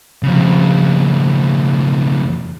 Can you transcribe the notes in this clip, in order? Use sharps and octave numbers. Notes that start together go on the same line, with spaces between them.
F2 C#3